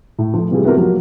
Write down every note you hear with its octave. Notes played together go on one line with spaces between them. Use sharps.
A2
F3 A3
C3 E3 G3 F4 G#4
B3 C4 E4 F#4 G4 A#4
F3 F#3 A#3 F4 F#4